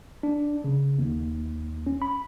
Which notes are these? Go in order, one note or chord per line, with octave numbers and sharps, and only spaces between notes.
D4
C#3
D#2
C#4
B5